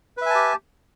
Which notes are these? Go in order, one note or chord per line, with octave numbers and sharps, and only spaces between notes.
G4 B4 E5 G#5 A5